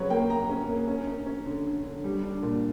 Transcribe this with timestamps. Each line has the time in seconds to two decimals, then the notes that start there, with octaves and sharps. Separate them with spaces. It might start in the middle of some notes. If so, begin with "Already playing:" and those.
Already playing: C#3 F#3 B4 C#5
0.10 A#3 G5
0.30 A#3 A#5
0.50 C#4
0.68 A#3
0.88 C#4
1.07 C#4
1.26 C#4
1.46 D3
1.66 D3
1.84 D3
2.04 G3
2.23 D4
2.43 A#2